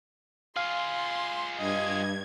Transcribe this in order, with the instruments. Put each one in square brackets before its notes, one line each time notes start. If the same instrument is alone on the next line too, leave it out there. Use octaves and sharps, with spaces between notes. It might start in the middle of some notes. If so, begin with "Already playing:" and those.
[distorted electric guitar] F4 G#4 [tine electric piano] F5 [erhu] C6
[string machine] G2 G#6 [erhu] D#5